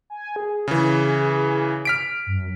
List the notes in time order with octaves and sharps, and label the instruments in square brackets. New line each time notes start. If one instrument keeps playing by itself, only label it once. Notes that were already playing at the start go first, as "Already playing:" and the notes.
[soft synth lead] G#5
G#4
[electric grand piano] C#3 E3
F6 B6 D7
[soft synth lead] F#2